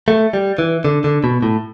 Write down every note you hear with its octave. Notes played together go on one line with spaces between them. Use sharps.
A3
G3
E3
D3
D3
B2
A2